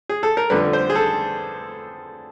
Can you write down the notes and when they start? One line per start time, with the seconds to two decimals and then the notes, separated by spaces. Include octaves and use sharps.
0.09 G#4
0.23 A4
0.37 A#4
0.50 F2 D3 G3 B4
0.73 C5
0.90 G#4
0.95 A4